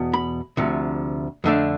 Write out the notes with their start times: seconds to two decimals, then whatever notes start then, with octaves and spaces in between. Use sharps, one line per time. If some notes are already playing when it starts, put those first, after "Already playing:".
Already playing: E2 B2
0.13 B5
0.57 D2 C3 F3
1.44 F2 D3 A3 D4